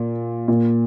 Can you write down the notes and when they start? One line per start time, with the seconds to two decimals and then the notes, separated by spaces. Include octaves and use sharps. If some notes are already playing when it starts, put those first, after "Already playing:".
Already playing: A#2
0.48 A#2